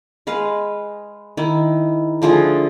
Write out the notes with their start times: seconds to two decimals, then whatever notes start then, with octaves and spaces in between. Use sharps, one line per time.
0.27 G#3 B4 F5
1.37 D#3 E4
2.22 D3 F3 A3 G#4